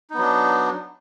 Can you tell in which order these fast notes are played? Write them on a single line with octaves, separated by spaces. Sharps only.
D#4 B3 F#3 D4